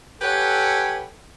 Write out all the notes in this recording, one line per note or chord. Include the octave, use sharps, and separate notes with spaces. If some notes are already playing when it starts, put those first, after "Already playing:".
G4 A4 B4 C#5 F#5 G#5